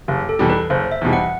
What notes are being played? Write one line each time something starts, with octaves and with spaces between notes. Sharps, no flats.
F#1 G4
A4
E2 B2 G3
B4
F#1 C5
E5
E2 B2 G3
F#5